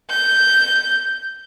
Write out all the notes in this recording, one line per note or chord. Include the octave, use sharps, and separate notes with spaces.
G6